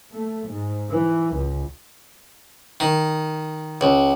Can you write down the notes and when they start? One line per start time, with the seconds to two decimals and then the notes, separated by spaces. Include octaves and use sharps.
0.11 A3
0.50 G#2
0.89 E3
1.34 C#2
2.80 D#3
3.81 C#2